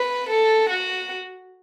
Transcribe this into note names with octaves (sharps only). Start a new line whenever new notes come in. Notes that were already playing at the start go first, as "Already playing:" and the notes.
Already playing: B4
A4
F#4